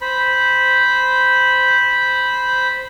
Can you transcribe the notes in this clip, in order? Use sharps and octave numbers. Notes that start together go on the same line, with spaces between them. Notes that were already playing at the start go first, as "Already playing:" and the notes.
C5 B5